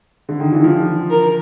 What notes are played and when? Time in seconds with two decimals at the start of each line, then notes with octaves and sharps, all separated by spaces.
0.29 D3
0.40 D#3
0.53 E3
0.64 F3
1.10 A#4